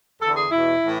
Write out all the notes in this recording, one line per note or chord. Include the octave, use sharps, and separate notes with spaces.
E2 D3 A4
G#4
E2 B2 E4
A2 E3